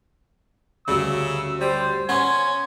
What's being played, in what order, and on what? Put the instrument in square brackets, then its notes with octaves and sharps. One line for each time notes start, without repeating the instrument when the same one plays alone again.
[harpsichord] D2 G2 F#3 [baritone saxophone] C#3 [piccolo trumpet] E6
[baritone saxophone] G3 [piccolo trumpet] C5
[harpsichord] B3 A#4 B4 [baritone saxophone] C#4 [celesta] F#5 C6 [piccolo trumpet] G#6